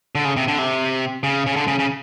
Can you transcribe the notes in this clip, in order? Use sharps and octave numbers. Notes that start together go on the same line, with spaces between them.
D3
C#3
C3
D3
C3
C#3
C#3
D3
C#3
C#3